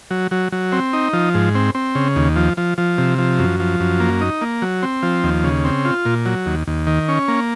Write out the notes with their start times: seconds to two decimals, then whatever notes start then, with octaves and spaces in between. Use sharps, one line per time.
0.11 F#3
0.31 F#3
0.52 F#3
0.72 C4
0.93 D#4
1.13 F3
1.34 G#2
1.55 C4
1.75 C4
1.95 C#3
2.16 D#2
2.36 F3
2.57 F3
2.78 F3
2.98 C3
3.18 F3
3.39 F#2
3.60 F3
3.80 F#2
4.00 A#3
4.21 D#4
4.41 A#3
4.62 F#3
4.83 C4
5.02 F3
5.24 D#2
5.44 C#3
5.65 C4
5.85 F4
6.05 A#2
6.26 F#3
6.46 D#2
6.67 D#2
6.87 D#3
7.08 C#4
7.28 A#3